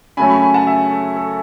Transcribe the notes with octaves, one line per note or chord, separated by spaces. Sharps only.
F#2 C#3 F#3 A3 C#4 G#5 B5
G#5 B5
G#5 B5
F#5 A5
E5 G#5
A4
A4